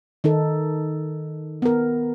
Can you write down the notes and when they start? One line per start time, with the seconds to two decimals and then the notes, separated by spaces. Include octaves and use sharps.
0.24 D#3 D#4 A4
1.62 B3 A#4